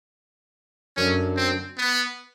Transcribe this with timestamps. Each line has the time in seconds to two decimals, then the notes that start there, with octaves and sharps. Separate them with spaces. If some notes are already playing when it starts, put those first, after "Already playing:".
0.97 F#2 D3 F#3 C#4
1.37 C4
1.77 B3